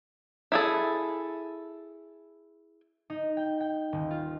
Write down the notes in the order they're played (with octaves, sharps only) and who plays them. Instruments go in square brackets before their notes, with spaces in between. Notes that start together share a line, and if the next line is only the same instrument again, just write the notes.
[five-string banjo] E4 G#4 A4
[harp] D#4
G5
G5
D#1
F4